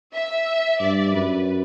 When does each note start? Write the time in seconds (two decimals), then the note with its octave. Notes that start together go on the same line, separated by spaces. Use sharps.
0.14 E5
0.80 G2 D5
1.13 F#2 B4